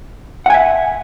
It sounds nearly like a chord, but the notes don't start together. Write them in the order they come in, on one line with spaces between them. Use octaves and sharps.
F#5 G#5 E5